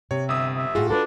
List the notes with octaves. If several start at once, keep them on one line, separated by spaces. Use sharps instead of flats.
C3 C#5
G1 E5 D#6
E5
A2 F4 F#4 G#4
D4 A4 B4